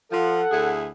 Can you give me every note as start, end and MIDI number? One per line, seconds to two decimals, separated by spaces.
0.12 0.42 53
0.12 0.74 69
0.12 0.74 78
0.51 0.87 38
0.51 0.87 64
0.51 0.87 68